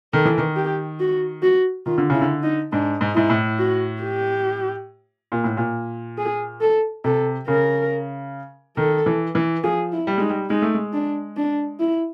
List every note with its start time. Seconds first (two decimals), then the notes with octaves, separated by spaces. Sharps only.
0.13 D#3 A4
0.25 E3
0.38 D#3
0.56 G4
1.00 F#4
1.42 F#4
1.86 D#3 F4
1.98 D3
2.10 C#3 E4
2.21 D3
2.43 D#4
2.72 G#2 D4
3.01 G#2
3.15 G#2 E4
3.30 A2
3.59 F#4
4.02 G4
5.32 A#2
5.44 A2
5.57 A#2
6.18 G#4
6.61 A4
7.04 C3 A4
7.48 C#3 A#4
8.77 D#3 A4
9.06 E3
9.35 E3
9.64 F3 G#4
9.93 E4
10.07 G3
10.18 G#3 D#4
10.29 G3
10.50 G#3 D#4
10.62 A3
10.74 G#3
10.93 D4
11.37 D4
11.80 E4